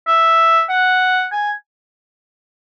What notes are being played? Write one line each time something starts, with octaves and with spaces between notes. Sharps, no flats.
E5
F#5
G#5